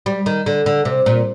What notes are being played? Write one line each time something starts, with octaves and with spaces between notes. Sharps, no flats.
G3
D#3
D3
D3
C3
A#2